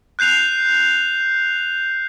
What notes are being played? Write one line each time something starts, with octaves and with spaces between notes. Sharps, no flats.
F#6 G6 C7 F7